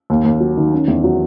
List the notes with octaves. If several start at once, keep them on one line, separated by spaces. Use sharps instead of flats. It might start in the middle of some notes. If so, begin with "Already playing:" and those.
D#2
D#2
F#3
D#3
C#4
E2
F#3